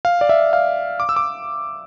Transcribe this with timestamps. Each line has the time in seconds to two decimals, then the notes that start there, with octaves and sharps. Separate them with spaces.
0.05 F5
0.21 D5
0.29 E5
0.53 F5
1.00 D6
1.09 E6
1.16 D6